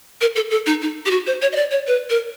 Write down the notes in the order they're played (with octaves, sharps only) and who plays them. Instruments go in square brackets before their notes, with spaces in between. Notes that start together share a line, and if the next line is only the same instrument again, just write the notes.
[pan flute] A#4
A4
A4
D#4
D#4
G4
F#4
C5
C#5
D#5
D5
C#5
B4
A#4